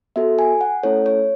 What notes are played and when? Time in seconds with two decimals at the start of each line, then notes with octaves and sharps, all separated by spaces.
0.16 B3 F#4 A4 E5
0.39 G#5
0.61 F#5
0.83 A3 C#4 E4 A4 C#5
1.06 C#5